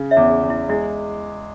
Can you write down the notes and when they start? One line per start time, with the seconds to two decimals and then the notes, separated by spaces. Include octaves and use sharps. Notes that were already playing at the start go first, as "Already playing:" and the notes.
Already playing: C#3
0.11 C#5 E5
0.17 E2
0.30 G#4
0.43 E2
0.50 E4
0.69 G#3 E4